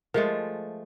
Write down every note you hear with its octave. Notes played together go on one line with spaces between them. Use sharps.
F3 G#3 A3 A#4